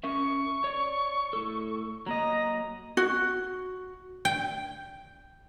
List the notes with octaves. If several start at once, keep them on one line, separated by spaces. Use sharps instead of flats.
C#4 A#4 E5 C#6
C#5 D5
A2 A4
F#3 A#3 D#5 A#5
F#4
G5